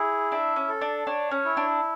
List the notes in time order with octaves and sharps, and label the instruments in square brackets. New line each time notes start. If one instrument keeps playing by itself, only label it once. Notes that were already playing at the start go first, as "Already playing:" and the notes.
Already playing: [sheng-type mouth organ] E4 G#4
[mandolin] D4 [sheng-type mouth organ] E5
[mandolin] C#4
[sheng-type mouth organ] A4
[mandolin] D4
[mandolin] D4 [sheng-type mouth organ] C#5
[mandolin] C#4
[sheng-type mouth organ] E4
[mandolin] D4